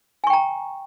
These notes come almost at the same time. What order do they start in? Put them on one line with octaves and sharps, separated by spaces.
G#5 C#6 G5 A#5